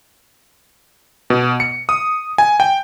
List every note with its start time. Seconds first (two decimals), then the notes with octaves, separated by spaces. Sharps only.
1.30 B2
1.60 C#7
1.89 D#6
2.38 G#5
2.60 G5